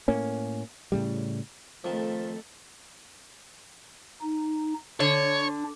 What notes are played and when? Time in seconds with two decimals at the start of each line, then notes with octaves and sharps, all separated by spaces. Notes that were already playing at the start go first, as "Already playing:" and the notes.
0.08 A2 A#3 C#4
0.92 A2 C#3 G3
1.84 F2 D#3 F3 A3 A4
4.22 D#4
5.00 D3 D4 C#5